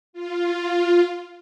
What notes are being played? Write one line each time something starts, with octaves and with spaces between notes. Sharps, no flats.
F4